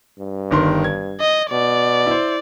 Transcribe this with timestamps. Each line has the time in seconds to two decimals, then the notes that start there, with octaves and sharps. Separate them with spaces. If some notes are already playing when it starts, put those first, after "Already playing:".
0.19 G2
0.51 G1 D#3 C6
0.84 G#6
1.20 D#5
1.51 B2 D5
2.06 E4 C5